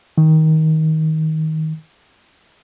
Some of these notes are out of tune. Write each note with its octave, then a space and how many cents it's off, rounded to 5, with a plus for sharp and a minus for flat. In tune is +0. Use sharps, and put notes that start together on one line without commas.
D#3 +20